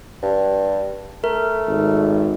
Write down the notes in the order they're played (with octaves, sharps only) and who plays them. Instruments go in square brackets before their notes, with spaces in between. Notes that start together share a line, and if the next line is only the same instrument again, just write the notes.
[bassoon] G2
[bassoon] A3 [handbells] A#4
[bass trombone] G#1